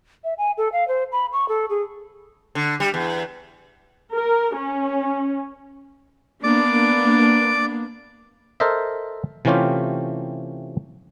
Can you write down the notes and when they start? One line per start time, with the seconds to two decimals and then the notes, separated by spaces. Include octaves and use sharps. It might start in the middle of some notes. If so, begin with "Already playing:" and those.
0.24 E5
0.38 G#5
0.58 A4
0.73 F5
0.88 C5
1.12 B5
1.32 C#6
1.48 A4
1.69 G#4
2.55 D3
2.80 G3
2.94 E2
4.15 A#4
4.57 C#4
6.43 A#3 B3 D4 D5 D6
8.60 A4 A#4 C5 D#5 E5
9.45 C3 E3 A3 C#4 F4 G4